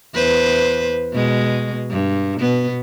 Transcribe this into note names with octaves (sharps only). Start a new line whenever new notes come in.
E2 B4 C5
B2 G#3
G2
B2 B3